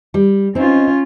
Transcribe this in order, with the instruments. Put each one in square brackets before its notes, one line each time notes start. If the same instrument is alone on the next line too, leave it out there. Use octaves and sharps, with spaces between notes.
[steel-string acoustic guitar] G3
[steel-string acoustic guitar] C4 D#4 [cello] C#4 F4